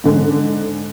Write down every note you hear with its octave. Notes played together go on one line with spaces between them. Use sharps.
G#2 D3